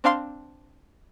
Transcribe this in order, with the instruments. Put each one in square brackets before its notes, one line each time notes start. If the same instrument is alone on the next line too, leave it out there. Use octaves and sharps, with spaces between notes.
[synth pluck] C4 D4 F5 C6